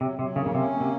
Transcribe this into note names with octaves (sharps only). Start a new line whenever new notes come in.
C3 F#3
C3 F#3
C#3 A#3
C#3
C3 C#4
A#3
C3